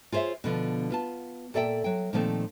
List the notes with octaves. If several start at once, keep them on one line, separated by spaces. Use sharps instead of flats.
F4 G#4 C5 C#5 E5
B2 D3 F3
B3 F4 A5
A#2 A4 D5 E5 G5
F#3 G5
A#2 D#3 F3 A3 C4